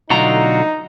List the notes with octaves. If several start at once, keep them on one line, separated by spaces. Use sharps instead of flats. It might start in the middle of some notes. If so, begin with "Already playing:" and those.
B1 D3 A3 D#4 F4 F#4 A#5